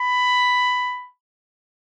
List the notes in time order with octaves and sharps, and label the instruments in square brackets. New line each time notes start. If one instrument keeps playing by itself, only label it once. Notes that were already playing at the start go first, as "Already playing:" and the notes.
Already playing: [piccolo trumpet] B5